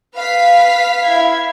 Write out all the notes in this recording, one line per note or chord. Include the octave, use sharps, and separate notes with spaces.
B4 F5 B6
E4 G#6